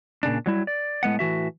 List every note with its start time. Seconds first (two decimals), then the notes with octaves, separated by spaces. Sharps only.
0.23 A#2 C#3 D4
0.46 F#3 G3 E4
0.67 D5
1.03 A2 G#3 B3 F#5
1.19 A2 E3 F#4 E5